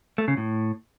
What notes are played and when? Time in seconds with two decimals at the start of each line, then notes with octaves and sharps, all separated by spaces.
0.18 A3
0.28 C#3
0.37 A2